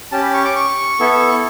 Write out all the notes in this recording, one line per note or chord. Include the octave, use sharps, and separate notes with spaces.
C#4 G4 A5
B5
C#6
D6
C#6
B3 E4 A4